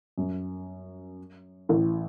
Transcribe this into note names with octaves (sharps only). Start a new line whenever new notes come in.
F#2
A1 A2